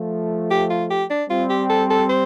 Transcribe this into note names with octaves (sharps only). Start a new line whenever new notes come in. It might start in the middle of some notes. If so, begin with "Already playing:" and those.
Already playing: F3 A3
G4
F4
G4
D4
G3 C4 F4
G4
A4
A4
C5